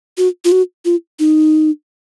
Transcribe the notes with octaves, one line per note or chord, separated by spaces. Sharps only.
F#4
F4
F#4
F4
D#4